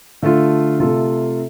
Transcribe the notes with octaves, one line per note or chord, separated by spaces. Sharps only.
D3 A3 F4
C3 A3 F4 A4